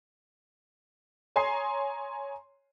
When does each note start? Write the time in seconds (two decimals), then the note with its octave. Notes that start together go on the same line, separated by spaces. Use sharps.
1.36 C#5 G#5 A#5 C6 D#6 C7